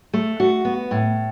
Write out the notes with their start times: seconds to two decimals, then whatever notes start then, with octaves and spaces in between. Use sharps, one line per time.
0.13 A3
0.40 F#4
0.65 B3
0.91 A2